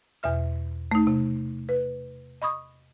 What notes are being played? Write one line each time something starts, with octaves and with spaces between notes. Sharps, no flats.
E2 B2 E5 F6
A3 D#4
C3
B4
D#5 B5 C#6 D#6